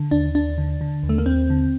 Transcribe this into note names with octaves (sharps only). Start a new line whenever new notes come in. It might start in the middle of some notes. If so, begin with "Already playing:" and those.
Already playing: D3
D#2 D4
D#2 D4
D3
D3
D#2
A3
A#3
D#2 C4
D3